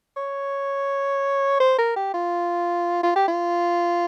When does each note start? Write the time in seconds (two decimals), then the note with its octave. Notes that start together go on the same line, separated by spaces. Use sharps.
0.17 C#5
1.60 C5
1.78 A#4
1.96 G4
2.14 F4
3.03 F4
3.16 G4
3.28 F4